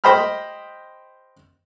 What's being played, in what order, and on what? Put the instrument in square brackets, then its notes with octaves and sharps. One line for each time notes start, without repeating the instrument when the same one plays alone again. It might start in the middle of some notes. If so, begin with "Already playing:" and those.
[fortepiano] G4 C5 D#5 G5 B5 F6